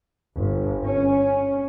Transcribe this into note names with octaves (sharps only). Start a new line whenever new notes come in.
G1
C#4